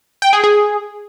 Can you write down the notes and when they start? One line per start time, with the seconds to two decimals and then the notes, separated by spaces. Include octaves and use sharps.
0.22 G5
0.33 G#4
0.44 G#4